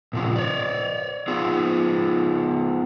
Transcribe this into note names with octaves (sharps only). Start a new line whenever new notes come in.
A#2 C#3 F3 F4
C#5 D5
B3 F4 G#4